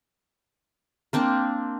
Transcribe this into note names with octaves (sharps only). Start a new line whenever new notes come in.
A#3 C4 D4